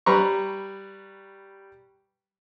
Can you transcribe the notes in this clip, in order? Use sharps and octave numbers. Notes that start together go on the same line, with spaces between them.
G3 B4 A#5 C#6